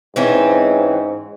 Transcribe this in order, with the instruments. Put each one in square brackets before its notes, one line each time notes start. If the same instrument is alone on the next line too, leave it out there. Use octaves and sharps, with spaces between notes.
[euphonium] G#2 [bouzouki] E3 C4 C#4